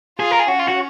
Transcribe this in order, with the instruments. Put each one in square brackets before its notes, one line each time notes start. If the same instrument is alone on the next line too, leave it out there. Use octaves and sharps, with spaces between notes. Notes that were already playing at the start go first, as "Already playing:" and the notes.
[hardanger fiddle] F4 [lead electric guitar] G#4
[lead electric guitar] A#4
G#4
[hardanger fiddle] C#4 [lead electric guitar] F#4
[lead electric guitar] F4
F#4